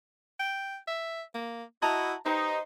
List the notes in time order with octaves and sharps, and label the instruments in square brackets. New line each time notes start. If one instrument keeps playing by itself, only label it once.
[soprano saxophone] G5
E5
A#3
[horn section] E4 F#4 [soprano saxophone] D#5 [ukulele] A5 A#5
[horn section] D#4 [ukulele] G4 B4 [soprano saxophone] C5